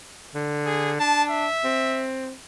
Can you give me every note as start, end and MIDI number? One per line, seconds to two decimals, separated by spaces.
0.35 0.95 50
0.66 0.92 68
1.00 1.46 62
1.00 1.24 81
1.31 2.07 76
1.64 2.32 60